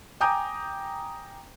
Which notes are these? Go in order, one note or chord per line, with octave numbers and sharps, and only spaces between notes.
G5 G#5 A#5 D6 D#6 G6